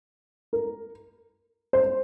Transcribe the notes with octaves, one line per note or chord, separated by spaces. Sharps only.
A#4
C5